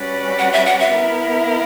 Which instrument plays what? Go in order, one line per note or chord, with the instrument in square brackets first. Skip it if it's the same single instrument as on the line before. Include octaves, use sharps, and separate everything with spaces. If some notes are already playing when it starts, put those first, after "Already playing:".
Already playing: [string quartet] G3 C#4 F#4 B4 D5
[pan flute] F#5
E5
F#5
E5
[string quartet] B3 E4 A#4